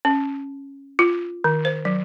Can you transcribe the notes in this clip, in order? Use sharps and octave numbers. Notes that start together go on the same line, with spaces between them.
C#4
F4
D#3
C5
F#3